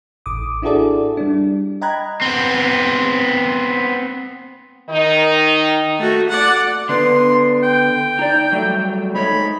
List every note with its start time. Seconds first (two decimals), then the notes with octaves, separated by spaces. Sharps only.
0.26 A1 D6 D#6
0.62 D4 E4 F#4 G#4 A4 D5
1.17 G3 D4
1.81 D#5 G5 A#5 B5 F#6 G#6
2.22 B3 C4
4.90 D#3 D#4
5.99 A3 F#4
6.29 D5 F#5
6.89 D3 B3 D4 C6
7.63 G5
8.19 D#4 D5
8.52 F#3 G3 A3
9.15 G#3 D#4 C#5 B5